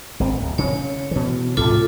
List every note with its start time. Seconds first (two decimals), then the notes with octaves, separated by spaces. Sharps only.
0.20 G#1 D3 C4
0.42 D1
0.58 C#3 C#5
1.11 B2 E3
1.57 D2 G#2 C3 F4 A4 D6